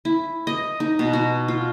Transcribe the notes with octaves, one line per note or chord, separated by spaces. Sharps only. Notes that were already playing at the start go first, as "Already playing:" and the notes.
E4
D#5
D#4
B2
F#4
F4